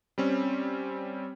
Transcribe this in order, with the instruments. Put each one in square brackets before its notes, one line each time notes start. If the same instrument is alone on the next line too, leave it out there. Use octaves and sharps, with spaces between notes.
[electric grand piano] G3 C4 C#4